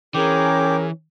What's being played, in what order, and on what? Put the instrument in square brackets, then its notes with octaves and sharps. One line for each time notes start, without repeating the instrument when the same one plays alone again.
[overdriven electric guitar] E3 [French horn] C#4 [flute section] G#4 A#4 [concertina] G5 D6